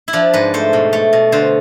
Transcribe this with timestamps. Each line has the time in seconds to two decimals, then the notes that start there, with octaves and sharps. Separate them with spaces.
0.08 E4
0.13 F3 D4
0.33 G#2 B4
0.54 A3 C5
0.73 B2
0.93 A3
1.13 B2
1.32 D3 C5